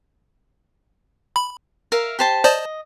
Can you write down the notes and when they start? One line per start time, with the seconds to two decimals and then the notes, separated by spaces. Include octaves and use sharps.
1.36 B5
1.92 A#4 E5 F5
2.19 G4 C5 A5
2.44 C5 D5 D#5 A5